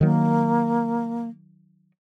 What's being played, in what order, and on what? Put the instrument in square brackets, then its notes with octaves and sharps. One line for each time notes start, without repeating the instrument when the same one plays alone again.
[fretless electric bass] D#3 F#3 [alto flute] A#3